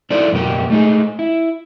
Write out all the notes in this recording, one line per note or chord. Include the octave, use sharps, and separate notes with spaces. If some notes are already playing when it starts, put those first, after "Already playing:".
D#4 E4 A4 C5 D5
F#2 B2 A#3 G4
A3 D#4 G#4
E4